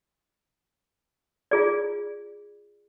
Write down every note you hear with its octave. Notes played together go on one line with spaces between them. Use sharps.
F4 G#4 D5